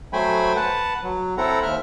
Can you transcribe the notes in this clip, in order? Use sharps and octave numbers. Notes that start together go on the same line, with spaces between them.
F#3 A3 C5 G5 G#5 B5
B4 F#5 A5
F#3
C4 E4 A4 F#5 A#5
D#2 E5 F6